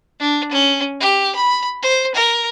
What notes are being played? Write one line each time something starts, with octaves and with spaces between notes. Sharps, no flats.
D4
C#4
G4
B5
C5
A#4